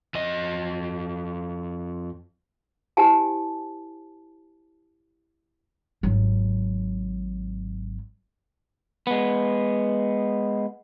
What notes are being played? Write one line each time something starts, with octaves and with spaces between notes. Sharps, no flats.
F2 D#5
E4 G4 C5 G#5 A5
G#1 F#3
G#3 B3